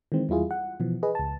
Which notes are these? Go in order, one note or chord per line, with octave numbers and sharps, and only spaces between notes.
D#3 E3 G#3 C4
E2 G3 E4 F4 G#4
F#5
B2 E3 F3
G#4 B4 D#5
C#2 A5